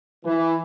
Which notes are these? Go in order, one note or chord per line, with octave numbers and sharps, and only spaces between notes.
E3